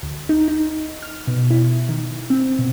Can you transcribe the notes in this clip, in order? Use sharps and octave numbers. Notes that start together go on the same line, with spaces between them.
D2
D#4
D#4
F6
B2
E4
D#3
C4
B2